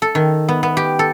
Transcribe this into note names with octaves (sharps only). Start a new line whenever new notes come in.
A4
D#3
B3
B3
G4
A4